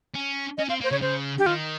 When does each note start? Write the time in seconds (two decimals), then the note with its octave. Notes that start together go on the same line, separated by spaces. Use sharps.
0.14 C#4
0.58 C#4 D#5
0.69 C4 F5
0.81 A#3
0.84 C5
0.91 C#3 C#5
1.02 C#3 C5
1.38 G4
1.46 D#3 F4